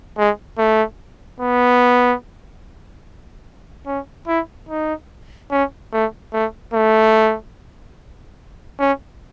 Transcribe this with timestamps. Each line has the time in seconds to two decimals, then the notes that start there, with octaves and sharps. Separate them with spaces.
0.18 G#3
0.58 A3
1.40 B3
3.86 C#4
4.28 E4
4.69 D#4
5.51 C#4
5.93 A3
6.33 A3
6.74 A3
8.80 C#4